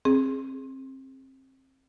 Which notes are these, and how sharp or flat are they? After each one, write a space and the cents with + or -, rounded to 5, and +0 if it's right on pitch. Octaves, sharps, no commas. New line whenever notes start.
C4 +30 G#4 +0